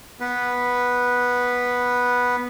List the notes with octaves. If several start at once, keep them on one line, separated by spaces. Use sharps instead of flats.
B3 B4